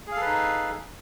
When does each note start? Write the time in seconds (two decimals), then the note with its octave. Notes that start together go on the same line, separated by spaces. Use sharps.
0.07 G#4
0.12 F5
0.16 A4
0.21 B4
0.26 D#4